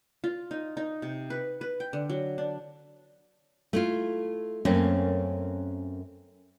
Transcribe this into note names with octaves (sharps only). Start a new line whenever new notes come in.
F4
D#4
D#4
C3
B4
B4
G5
D3
F#3
D4
A3 E4 F4
F#2 A3 A#3 C4 C#4